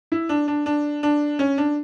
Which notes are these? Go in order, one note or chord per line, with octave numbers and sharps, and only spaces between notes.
E4
D4
D4
D4
D4
C#4
D4